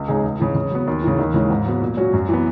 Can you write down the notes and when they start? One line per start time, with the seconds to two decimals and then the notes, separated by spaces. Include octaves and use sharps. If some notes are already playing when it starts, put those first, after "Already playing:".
Already playing: C#2
0.08 C#3 G#3 D#4 G#4
0.24 C#2
0.39 C#3 E3
0.55 C#3
0.71 F#3 B3
0.87 D#2
1.03 C#3 E3
1.19 D#2
1.34 C#3 E3 G#3
1.50 G#2
1.66 F#3 B3
1.82 A#2
1.97 F#3 C#4 F#4
2.13 F#2
2.29 E3 B3